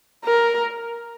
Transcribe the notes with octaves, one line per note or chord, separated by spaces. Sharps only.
A#4